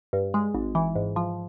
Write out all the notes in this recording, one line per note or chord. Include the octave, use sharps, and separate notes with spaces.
G2
G#3
G#1
E3
G#2
F3